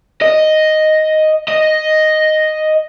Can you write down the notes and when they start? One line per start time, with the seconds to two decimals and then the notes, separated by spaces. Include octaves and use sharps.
0.22 D#5
1.48 D#5